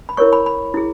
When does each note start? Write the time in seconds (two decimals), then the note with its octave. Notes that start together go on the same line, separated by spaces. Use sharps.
0.09 B5
0.17 E4 A#4 C#5 C#6
0.33 B5
0.46 B5
0.74 E4 G#4